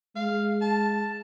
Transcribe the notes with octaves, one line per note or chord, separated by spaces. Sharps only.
G#3 F5
A5